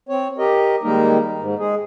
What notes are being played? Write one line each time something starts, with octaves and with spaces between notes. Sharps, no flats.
C4 C#5
G4 A#4 D#5
D#3 G3 G#3 A#3 D#4 A#4
G#2
G#3 G#4